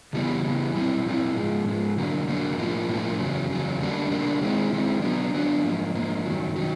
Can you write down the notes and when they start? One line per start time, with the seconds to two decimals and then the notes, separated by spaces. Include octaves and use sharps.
0.13 C#3 E3 G3 B3
0.44 C#3 E3 G3 B3
0.74 A#2 G3 C4 E4
1.05 A#2 G3 C4 E4
1.36 G#2 F3 G#3
1.66 G#2 F3 G#3
1.97 D3 F#3 A#3
2.28 D3 F#3 A#3
2.57 A2 F3 A#3
2.89 A2 F3 A#3
3.19 E2 C#3 F#3
3.49 E2 C#3 F#3
3.81 D3 G3 A#3 D4
4.11 D3 G3 A#3 D4
4.41 D#3 G#3 C4 E4
4.73 D#3 G#3 C4 E4
5.02 D3 F#3 B3 D4
5.34 D3 F#3 B3 D4
5.64 G#2 F3 A#3
5.95 G#2 F3 A#3
6.26 G2 D#3 F#3
6.56 D#3 F#3